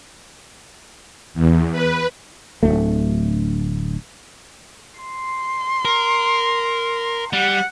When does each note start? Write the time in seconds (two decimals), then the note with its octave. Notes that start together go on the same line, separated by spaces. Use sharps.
1.34 E2
1.72 B4
2.63 D1 G1 D2 A3
5.01 C6
5.85 A#4
7.33 G3 F#5